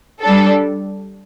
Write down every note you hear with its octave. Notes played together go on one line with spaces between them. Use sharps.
G3 D4 A4